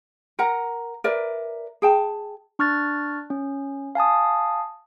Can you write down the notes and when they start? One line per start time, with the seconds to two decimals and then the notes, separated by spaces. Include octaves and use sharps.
0.39 A#4 F#5 A#5
1.04 A#4 B4 D5 E5
1.82 G#4 G5 A5
2.59 D4 C#6 F6 F#6 A6
3.30 C#4
3.95 F5 G#5 A5 D#6